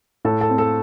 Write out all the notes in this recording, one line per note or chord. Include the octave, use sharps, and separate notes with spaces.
A2 A4 A5
A4 A5
C4
A4 A5